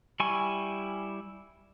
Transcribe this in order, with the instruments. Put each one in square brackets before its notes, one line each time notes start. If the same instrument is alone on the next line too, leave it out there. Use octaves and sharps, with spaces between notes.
[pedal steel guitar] G3 E4 G#5 C#6